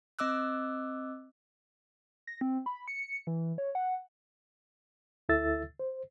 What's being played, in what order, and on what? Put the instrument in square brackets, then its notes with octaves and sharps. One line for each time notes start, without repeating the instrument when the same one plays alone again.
[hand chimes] C4 D#5 D6 E6 F#6
[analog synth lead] A#6
C4
B5
C#7
E3
C#5
F#5
[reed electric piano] D2 E4 A4 E5 E6 A6
C5